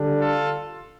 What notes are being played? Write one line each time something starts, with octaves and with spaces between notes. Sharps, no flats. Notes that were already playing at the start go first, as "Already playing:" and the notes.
Already playing: D3 G3 D4
F4 A4